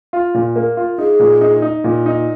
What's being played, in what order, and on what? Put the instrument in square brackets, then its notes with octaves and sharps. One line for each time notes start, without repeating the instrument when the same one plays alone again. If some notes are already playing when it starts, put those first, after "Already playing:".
[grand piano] F4
A#2
A#3
F4
[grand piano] D#4 [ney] G#4
[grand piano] A#2
D#4
D#4
A#2
D#4